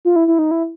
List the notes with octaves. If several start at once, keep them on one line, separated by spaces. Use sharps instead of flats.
F4
E4
E4
D#4
E4